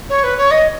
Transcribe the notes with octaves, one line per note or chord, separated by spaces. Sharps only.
C#5
B4
C#5
D#5